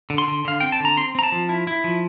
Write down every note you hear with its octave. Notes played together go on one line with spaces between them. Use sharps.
D3
C6
D3
D3 F5
C4 G5
A5
D3 A#5
C4 C6
C4 A#5
A5
F3
E4
E4
F3